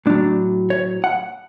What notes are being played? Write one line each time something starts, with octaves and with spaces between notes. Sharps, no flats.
A2 F#3 D4
C#5
F#5